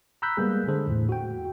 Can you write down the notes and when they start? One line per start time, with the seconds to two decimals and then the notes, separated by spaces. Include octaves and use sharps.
0.22 A#5 B5 E6 F#6 G6 B6
0.37 G3 G#3 A#3 B3 G#4
0.68 D3 G#3 G#4 A4 C5
0.87 E2 A2
1.09 F#4 G5